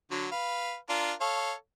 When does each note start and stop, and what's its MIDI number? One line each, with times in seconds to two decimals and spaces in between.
0.11 0.27 50
0.11 0.27 54
0.32 0.76 71
0.32 0.76 77
0.89 1.13 62
0.89 1.13 65
0.89 1.13 70
1.21 1.53 69
1.21 1.53 73
1.21 1.53 77